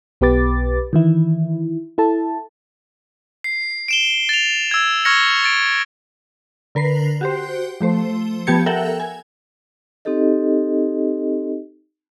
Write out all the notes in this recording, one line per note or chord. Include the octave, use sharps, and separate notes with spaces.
B1 B3 G4 B4 D6 A6
D#3 E3 E4
E4 A4 A5
C7
D7 E7 G7
A6 F7
E6 G#6
C#6 F6 G#6 A#6 C#7
A6 D7
D3 A#4 B4 C7
F#4 G4 C5
F3 A3 C5
F3 B3 G4 A5 G#6 C#7
A4 A#4 E5 F#5 G5
G#5
C4 D#4 G4 A4 D#5